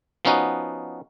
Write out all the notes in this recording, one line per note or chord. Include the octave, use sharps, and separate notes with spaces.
F3 B3 C#4 D#4 F#4